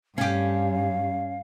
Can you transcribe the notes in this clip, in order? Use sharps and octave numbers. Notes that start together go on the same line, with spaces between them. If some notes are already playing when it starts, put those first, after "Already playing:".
G2 C#4 G4 F5